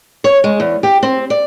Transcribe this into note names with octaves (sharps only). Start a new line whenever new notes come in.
C#5
G#3
E2
G4
C4
D5